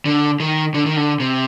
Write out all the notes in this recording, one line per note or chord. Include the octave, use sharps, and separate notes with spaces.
D3
D#3
D3
D#3
D3
C3